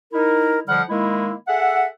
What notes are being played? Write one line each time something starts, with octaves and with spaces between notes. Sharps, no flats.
D#4 E4 A#4
F2 D3 F3 G3 F#5 F6
D#3 G#3 A#3 E4
G#4 A4 E5 F#5